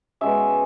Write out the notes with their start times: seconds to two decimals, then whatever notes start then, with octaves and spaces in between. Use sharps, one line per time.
0.21 B2 G#3 C#4 E5